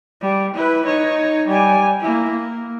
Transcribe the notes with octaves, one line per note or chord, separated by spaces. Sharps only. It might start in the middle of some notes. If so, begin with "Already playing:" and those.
G3
E4 B4
D#4 C#5
G3 G#5
A#3 E4
A#3